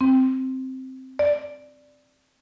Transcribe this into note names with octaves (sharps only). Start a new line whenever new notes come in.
C4
D5